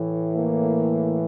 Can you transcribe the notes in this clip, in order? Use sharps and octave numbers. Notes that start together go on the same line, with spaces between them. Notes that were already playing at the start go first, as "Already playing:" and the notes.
Already playing: A2 E3
A#3